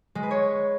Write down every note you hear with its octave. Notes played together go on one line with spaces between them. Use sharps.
G#3
B4
C#5